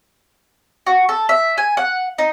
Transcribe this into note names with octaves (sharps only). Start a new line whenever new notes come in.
F#4
A4
E5
G#5
F#5
D#4